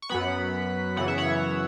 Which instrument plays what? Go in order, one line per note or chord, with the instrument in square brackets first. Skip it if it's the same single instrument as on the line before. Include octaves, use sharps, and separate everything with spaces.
[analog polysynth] C#6
F#2 F#3 B3 F#5 B5
F#2 C#3 E3 B3 F#5
E5
C#5 F#5